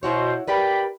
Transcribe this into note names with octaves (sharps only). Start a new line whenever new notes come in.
B2 E4 F#4 C5 C#5
G4 A#4 B4 D5 G5 B5